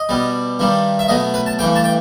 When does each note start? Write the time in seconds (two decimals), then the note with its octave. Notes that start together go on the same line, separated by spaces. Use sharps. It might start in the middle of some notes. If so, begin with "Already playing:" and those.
Already playing: D#5
0.09 B2 G3
0.59 G2 D#3 G3
0.99 E5
1.08 B2 F#3 A3 D#5
1.34 B4
1.46 A5
1.59 G2 E3 A3 G5
1.75 A5
1.84 G5